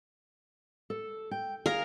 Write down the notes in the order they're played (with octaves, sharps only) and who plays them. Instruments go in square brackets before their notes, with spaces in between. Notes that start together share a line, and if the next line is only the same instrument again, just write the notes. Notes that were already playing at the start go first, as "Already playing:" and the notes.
[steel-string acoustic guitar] A4
G5
[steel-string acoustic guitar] G#4 F5 [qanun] A#4